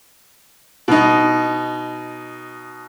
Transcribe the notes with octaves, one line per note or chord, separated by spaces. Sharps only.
B2 D#4